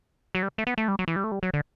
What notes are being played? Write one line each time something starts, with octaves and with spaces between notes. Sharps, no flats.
F#3
G3
A3
B3
A3
G3
F#3
E3
G3
A3
G3
F#3
D3